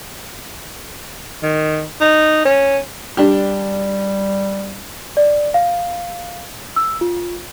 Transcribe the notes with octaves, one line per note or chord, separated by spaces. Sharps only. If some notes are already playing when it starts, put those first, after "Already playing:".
D#3
D#4
C#4
G3 D4 G4
D5
F5
E6
F4